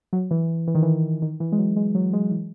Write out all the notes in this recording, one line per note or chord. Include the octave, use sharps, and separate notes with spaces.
F#3
E3
E3
D#3
E3
D#3
E3
G#3
F#3
G#3
F#3
G#3
E3